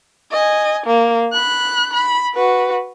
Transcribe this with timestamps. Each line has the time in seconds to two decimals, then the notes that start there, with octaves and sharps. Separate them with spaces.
0.32 D#5 G#5
0.87 A#3
1.33 B5 F#6
1.94 B5
2.35 F#4 B4